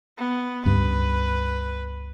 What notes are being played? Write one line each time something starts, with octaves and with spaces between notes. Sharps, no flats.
B3
C#2 G2 B4